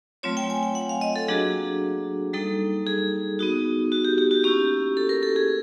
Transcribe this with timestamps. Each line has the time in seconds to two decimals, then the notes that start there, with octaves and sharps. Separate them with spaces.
0.23 F#3 A3 C4 F4 C#5
0.37 G5
0.50 G#5
0.63 G5
0.75 F#5
0.89 F5
1.01 D#5
1.16 A4
1.28 F#3 A#3 D4 F#4 G#4
2.33 G3 A#3 D#4 A4
2.86 G#4
3.39 B3 D#4 F#4
3.92 F#4
4.05 G4
4.18 G4
4.31 F#4
4.44 A#3 C#4 E4 G4
4.97 A4
5.09 A#4
5.23 A4
5.36 G#4